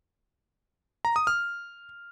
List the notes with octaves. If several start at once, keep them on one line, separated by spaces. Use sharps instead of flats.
A#5
D#6
F6